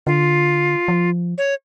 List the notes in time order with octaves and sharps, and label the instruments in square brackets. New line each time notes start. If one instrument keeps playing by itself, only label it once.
[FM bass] D3 [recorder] F4
[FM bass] F3
[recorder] C#5